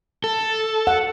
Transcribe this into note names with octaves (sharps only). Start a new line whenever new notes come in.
A4
F#5